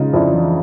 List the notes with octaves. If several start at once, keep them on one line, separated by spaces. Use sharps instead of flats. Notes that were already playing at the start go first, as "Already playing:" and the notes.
Already playing: C#3 G#3 D#4 F4
F2 D4 E4
E3